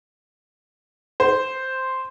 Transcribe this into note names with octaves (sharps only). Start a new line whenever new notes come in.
C5